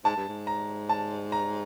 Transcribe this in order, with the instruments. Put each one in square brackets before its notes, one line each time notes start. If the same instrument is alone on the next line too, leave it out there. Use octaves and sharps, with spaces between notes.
[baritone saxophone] G#2 [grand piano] A5
[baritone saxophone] G2
G#2
[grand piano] A#5
A5
A#5